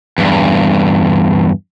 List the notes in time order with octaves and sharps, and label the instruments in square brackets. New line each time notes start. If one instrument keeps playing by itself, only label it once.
[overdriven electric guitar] E2 G2